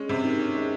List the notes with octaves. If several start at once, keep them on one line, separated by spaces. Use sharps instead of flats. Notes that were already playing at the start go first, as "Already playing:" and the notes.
Already playing: G#3 C#4
C3
D#3
C#4
G#3